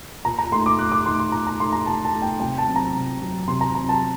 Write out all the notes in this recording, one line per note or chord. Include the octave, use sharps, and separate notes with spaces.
A#2 A#5
A#5
A3 D#4 C6
D6
A#2 F#6
D6
A3 D#4 C6
C6
A#2 A#5
A#5
A3 D#4 C6
A#5
A#2 A5
A5
A3 D#4
G5
C3 G5
A5
F#3 C4
A#5
C3
F#3 C4
C3 C6
A#5
F#3 C4 A#5
A5